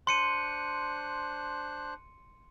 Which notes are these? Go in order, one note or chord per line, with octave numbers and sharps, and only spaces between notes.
D4 C5 C6 F#6 C#7 D#7